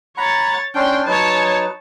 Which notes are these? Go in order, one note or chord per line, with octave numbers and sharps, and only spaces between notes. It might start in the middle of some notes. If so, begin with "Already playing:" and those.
C#5 F#5 A#5 B5 A6
C#4 D4 G5 C6
F#3 D#4 B4 C#5 A5